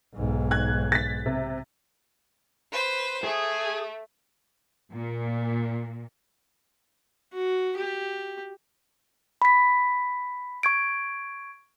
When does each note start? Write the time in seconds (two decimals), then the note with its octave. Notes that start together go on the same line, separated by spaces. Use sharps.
0.15 B1 G#2
0.51 F#6 G#6
0.92 A6 B6
1.26 C3
2.72 B4 C5
3.24 A3 G#4
4.92 A#2
7.33 F#4
7.77 G4
9.42 B5 B6
10.63 C#6 G#6 D7